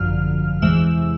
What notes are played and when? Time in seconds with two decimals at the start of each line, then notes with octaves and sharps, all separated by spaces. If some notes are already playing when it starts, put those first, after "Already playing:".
Already playing: G#1 F#2 D3 F3 F6
0.62 E2 C3 E3 G#3 E6